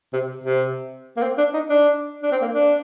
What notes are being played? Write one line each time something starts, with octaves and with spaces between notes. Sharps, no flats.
C3
C3
A#3
C4
D4
D#4
D4
D4
C4
A#3
D4